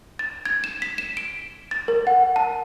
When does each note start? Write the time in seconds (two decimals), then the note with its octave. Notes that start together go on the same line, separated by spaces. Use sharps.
0.19 A6
0.45 G#6
0.64 E7
0.82 B6
0.98 E7
1.17 D7
1.71 A6
1.88 A#4
2.07 F#5
2.36 A5